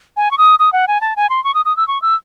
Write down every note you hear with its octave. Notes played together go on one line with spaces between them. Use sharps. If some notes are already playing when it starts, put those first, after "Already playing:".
G#5
C#6
D#6
D#6
F#5
G#5
A5
G#5
C6
C#6
D#6
D#6
E6
C#6
E6